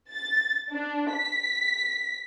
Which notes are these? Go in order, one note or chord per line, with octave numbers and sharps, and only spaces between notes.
A6
D4
B6